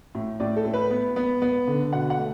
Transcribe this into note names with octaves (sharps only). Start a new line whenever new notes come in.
A2
A2 D5
A4
A2
B4
B3
B3
B3
D3
B2 F#5
F#5
A3